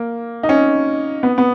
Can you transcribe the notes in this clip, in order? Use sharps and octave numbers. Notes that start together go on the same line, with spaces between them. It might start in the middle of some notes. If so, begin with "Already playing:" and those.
Already playing: A#3
D#4
C#4
B3
B3